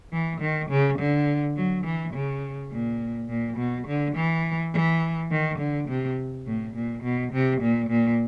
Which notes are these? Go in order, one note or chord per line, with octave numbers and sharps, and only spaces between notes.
E3
D#3
C#3
D3
F#3
E3
C#3
A#2
A#2
B2
D3
E3
E3
D#3
D3
C3
A2
A#2
B2
C3
A#2
A#2